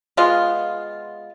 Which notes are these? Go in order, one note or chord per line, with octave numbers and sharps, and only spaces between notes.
G#3 B3 F4